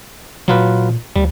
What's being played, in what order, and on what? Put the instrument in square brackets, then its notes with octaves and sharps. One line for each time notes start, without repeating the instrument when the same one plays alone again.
[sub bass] A#2 [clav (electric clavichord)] F#3 F4 B4
[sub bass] D2 [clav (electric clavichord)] G3